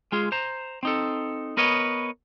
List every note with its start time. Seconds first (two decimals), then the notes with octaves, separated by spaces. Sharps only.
0.12 G#3 F4 G#4
0.32 C5 A#5
0.83 C4 D#4 A4
1.57 B3 A#4 B4 C#5 D#5